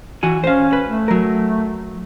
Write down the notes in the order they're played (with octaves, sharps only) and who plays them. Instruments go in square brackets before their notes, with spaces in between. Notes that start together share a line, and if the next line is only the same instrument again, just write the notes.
[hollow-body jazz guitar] E3 F#4 G#5
[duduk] C#4 [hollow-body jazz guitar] C5 F5
[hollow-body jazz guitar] B4
[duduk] A3
[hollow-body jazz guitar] F#3 A#4